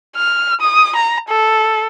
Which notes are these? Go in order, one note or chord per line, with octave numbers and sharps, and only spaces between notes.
F6
D#6
A#5
A4